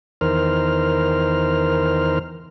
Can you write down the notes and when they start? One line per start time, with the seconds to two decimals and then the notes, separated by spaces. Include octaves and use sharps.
0.21 E2 D#3 A#4 C5 F6